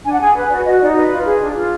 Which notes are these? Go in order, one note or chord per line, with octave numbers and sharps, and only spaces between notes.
D4 G#5
F#5
G#4 G#5
B4
F#4 D5
F#4 D#5
D#4 D5
B4 D#5
F4
G#4
D4
F4